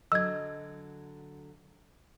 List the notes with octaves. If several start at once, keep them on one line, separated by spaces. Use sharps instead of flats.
D3 F#3 D#5 E6 G#6